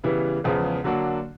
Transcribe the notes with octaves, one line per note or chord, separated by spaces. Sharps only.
C#3 E3 G3 B3 E4
E2 C#3 F3 G#3 B3
D3 F#3 A#3 D4 F#4